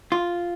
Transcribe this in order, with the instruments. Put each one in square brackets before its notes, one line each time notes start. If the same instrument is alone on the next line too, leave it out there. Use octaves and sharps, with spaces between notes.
[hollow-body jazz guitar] F4